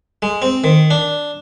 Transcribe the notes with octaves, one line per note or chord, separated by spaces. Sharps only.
G#3
C4
D#3
D4